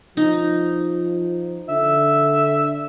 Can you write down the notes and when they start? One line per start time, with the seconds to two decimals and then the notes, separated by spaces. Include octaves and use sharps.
0.17 F3 D#4
1.69 D3 E5